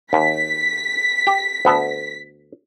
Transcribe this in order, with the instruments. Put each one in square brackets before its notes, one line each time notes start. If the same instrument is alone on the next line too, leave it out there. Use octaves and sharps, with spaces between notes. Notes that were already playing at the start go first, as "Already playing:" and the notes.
[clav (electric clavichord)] D#2 [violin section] B6
[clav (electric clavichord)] G4
D2 B3 A4